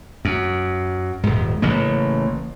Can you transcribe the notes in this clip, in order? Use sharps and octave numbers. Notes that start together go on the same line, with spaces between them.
F#2
D#1 G#2
A1 C#3 A#3